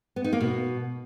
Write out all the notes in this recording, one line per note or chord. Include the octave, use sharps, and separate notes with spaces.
B3
D#4
A#3
B2